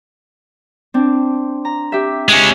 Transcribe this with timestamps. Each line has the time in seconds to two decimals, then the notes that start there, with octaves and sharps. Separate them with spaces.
0.94 C4 D4
1.65 A#5
1.92 G4 E5
2.29 G#3 C#4